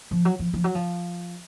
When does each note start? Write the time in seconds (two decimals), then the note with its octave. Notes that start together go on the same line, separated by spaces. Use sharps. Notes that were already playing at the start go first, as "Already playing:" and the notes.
0.11 F3
0.25 F#3
0.39 F3
0.53 F3
0.64 F#3
0.75 F3